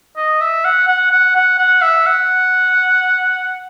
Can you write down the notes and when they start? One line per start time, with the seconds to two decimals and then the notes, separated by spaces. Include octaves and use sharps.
0.17 D#5
0.41 E5
0.65 F#5
0.88 F#5
1.11 F#5
1.36 F#5
1.58 F#5
1.82 E5
2.06 F#5